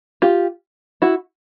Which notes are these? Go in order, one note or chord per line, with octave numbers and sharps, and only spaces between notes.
F4 G4
E4 F#4